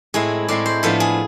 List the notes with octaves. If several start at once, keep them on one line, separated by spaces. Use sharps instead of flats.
A2 G#3 C4 E4 G#4
A2 G#3 C4 E4 D5
C5
A2 F3 B3 D4 A4
G#4